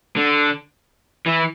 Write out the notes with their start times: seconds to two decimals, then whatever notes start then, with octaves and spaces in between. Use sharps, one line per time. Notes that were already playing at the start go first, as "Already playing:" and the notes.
0.16 D3
1.26 E3